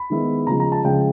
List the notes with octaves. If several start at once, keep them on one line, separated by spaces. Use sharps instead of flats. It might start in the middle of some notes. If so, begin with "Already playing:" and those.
Already playing: B5
D#3 G#3 B3 E4
C#3 F3 G#3 A#5
A#5
A5
C#3 F3 G#3 G5